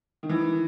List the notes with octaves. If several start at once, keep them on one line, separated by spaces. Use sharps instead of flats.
D#3
E3